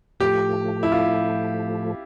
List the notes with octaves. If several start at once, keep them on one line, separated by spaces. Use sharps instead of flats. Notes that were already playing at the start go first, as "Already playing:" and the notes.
A2 F3 A3 G4
E4
F4